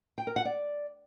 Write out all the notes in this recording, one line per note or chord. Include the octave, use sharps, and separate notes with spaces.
G5
A#4
F#5
D5